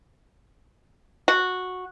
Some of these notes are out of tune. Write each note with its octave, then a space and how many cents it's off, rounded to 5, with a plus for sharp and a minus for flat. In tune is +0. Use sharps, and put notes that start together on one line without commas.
F#4 -10